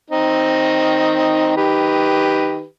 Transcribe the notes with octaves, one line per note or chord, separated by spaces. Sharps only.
D#3 C4 D#4
D#3 G4 B4